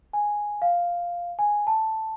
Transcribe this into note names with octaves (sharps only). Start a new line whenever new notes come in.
G#5
F5
G#5
A5